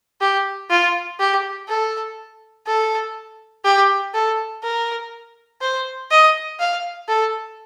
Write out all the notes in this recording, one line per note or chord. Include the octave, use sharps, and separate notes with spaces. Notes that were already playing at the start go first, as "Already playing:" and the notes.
G4
F4
G4
A4
A4
G4
A4
A#4
C5
D#5
F5
A4